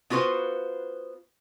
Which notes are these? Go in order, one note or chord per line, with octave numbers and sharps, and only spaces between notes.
B3 F4 F#4 B4 C5